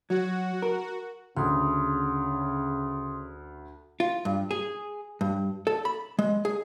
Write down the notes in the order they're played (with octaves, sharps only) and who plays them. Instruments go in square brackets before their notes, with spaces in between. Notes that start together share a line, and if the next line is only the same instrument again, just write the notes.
[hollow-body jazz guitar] F#3 [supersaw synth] F#4
[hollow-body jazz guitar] A#4
[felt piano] D2 [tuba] C#3 [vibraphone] C6 D#6
[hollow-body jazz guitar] F4
G2
G#4
G2
A4
B5
G#3
G#4